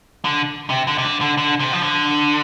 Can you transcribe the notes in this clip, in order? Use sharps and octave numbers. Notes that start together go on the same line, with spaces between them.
D3
C3
D3
C3
D3
D3
D3
C3
F3
D3